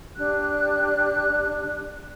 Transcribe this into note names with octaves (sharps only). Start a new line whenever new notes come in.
D4 G4 F#6